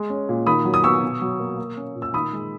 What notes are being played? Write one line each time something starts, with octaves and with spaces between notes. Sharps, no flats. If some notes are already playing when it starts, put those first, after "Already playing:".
Already playing: G#3
C#4
A#2
D#3 B5 D#6
F#3
D#6
B3 C#6 E6
B2
F#3
A#3
A#3
C#4
A#2
E6
D#3 B5 D#6
G#3